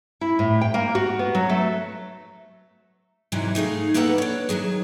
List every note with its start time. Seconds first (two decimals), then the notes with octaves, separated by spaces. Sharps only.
0.21 E4
0.39 A2
0.61 G5
0.74 A#3
0.95 F#4
1.19 B3
1.35 F#3
1.50 A3
3.32 G#2 C3 E3 F#3 G3
3.55 A3 D#4 G#4 F5
3.94 A#3 B3 A4 B4 D5 F#5
4.18 D4 C#5
4.49 D#3 F3 F#3 G#4